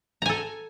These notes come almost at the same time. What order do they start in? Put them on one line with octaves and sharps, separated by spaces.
A#5 G#5 A4